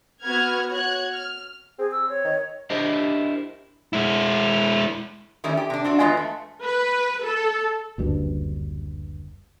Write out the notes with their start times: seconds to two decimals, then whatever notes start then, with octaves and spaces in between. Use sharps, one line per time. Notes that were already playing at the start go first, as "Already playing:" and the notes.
0.23 B3 F#4 B4 F#5 F6 G#6
0.70 F#4 C#5 F#6 G#6
1.13 F6
1.79 C4 G#4
1.92 E6
2.09 C#5
2.25 D#3
2.70 D4 E4 G4 A#4 C5 D#5
3.93 G#3 E4
5.44 D#3 G3 A3 C#4 E4
5.57 G4
5.70 C3 D4
5.84 C4 D4 F#4
5.99 E2 B2 G#3 F4 B4 D#5
6.17 A3
6.64 B4
7.24 A4
7.98 F#1 D2 G2